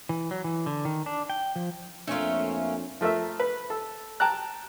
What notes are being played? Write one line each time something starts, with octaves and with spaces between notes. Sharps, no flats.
E3
F#3
E3
D3
D#3
D4
G5
F3
F2 A3 A#3 C#4 D4 F4 C#5 E5
F3 A3 A#4 E5
B4
A4
G5 A5 A#5 F#6